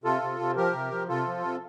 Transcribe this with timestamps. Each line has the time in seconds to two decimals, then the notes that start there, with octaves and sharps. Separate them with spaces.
0.04 C3 F4 A4
0.22 C3
0.40 C3
0.56 F3 G4 A#4
0.74 C3
0.91 F3
1.08 C3 F4 A4
1.26 F3
1.43 C3